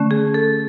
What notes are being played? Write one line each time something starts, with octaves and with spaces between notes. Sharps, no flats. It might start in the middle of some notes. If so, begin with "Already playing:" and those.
Already playing: D3 A3 C#4
G#4
A4